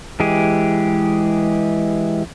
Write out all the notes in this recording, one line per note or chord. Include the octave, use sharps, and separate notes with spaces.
E3 G#3 G4 G#4